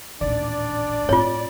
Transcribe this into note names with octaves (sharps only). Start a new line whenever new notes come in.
D#1 A1 D4 D5
A2 C4 F4 C#5